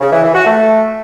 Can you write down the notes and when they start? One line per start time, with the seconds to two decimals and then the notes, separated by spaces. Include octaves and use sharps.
0.01 C#3
0.12 E3
0.24 E3
0.35 F#4
0.46 A3